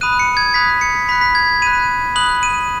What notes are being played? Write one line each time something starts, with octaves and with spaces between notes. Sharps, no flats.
B5 D#6 F#6 D#7
C#7
G#6
B5 D#6 F#6 B6
C#7
B5 F#6 B6
B6
G#6
B5 F#6 D#7
B5 D#6 F#6 F#7
D#7